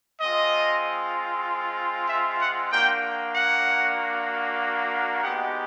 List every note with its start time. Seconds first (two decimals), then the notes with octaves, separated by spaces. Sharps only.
0.21 G#3 C4 F4 D#5
2.09 E5
2.41 F#5
2.71 A#3 D4 F#4 G5
3.35 F#5
5.23 G#3 B3 D#4 G4 F#5